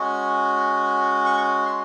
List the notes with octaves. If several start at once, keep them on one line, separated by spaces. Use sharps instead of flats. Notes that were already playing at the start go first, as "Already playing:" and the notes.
Already playing: G#3 C#4 F#4
C#6
C6